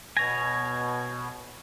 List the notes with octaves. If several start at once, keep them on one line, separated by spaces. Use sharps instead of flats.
B2 C#5 G#5 A#6